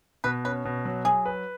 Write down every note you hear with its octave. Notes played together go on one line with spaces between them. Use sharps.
B2 B4
C#4 B4
B2
F#3
F#3 G#4
B4